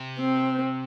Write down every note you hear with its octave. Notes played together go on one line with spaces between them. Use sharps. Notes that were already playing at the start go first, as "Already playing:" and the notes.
Already playing: C3
C4